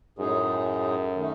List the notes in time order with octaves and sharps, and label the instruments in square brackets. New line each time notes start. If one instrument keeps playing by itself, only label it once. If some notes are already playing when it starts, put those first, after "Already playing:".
[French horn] F#2 [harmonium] A2 G#3 D#4 G#4
[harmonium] D#3 A3 D#4